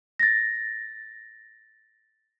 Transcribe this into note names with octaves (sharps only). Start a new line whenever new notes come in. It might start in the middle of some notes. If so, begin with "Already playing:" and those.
A6 A#6